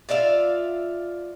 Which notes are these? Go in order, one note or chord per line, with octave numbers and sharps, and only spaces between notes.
F4 D5 E5 F5